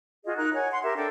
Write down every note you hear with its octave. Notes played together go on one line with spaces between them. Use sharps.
F4 F#4 G#4 D#5
D#4 A#4 F#6
C#5 F#5 G#5
F#5 C6
G4 A#4 E5
D4 A4 G5